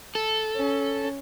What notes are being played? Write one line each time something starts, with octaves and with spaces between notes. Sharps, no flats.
A4
C#4